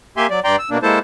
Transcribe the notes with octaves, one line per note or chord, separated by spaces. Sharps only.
A#3 G4 E5 G#5 C6
F#3 D5
G2 D5 G5 A#5 C6
E6
B2 A#3 D4
G#3 A#3 E4 A4 C5 A5